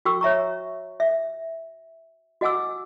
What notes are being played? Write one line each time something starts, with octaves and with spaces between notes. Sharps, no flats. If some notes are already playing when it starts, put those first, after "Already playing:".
F#4 G5 C#6 E6
C#5 E5 A#5 C#6
E5
F#4 D#5 F#5 G#5 D6 E6